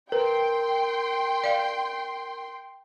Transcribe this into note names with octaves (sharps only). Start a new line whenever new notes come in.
A#4 B4 G5 C6
D5 F5